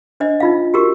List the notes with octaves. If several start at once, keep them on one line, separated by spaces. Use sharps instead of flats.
D4 C5 D#5
D#4 F4 F5
F#4 G4 A#4 C#6